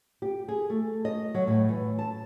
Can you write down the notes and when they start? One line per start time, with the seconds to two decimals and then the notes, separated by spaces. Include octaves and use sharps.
0.22 G4
0.48 G#4
0.70 A3
1.05 D#5
1.34 F#3
1.47 A2
1.69 E3
1.99 A5